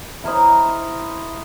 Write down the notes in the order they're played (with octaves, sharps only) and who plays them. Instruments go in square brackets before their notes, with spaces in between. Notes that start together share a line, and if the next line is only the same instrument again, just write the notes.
[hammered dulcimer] E4 A#4 C5 D#5